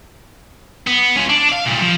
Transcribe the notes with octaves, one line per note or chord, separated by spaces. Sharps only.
B3
C#4 F4
D4
D5 F5
A#2 G3
F3